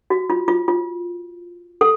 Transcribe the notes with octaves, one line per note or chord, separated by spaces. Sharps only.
F#4
F4
F4
F4
A4